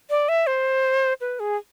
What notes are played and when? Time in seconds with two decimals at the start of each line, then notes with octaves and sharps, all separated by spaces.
0.10 D5
0.29 E5
0.47 C5
1.21 B4
1.40 G#4